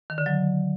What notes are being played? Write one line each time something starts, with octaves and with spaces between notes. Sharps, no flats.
D#3
D3
F#3